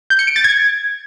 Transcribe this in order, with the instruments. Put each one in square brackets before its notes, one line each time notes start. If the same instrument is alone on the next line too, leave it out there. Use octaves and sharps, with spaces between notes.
[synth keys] G6
C#7
D7
A6
G#6